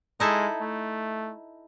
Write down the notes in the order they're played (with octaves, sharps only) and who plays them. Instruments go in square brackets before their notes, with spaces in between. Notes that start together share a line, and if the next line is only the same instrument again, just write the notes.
[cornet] G#3 [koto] D#4 E4 A4
[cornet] A3